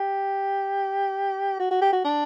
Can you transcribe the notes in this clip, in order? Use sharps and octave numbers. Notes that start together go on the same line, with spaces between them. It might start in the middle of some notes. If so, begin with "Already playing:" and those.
Already playing: G4
F#4
F#4
G4
F#4
D4